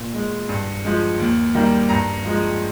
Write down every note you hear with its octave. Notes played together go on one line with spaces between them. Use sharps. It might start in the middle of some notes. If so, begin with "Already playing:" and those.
Already playing: A#2
G#3
G2
F3 G#3
D#2
D#3 G3 A#3
G2 A#5
F3 G#3